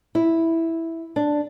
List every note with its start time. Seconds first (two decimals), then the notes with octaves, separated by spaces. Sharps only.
0.15 E4
1.16 D4